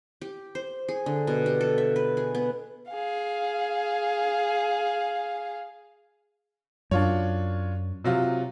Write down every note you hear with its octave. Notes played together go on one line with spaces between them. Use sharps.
G4
C5
G#4
D3
B2
G4
A4
E5
B4
G#4
B3
G#4 F5
F#2 D4 F4 C#5
C3 F#3 F4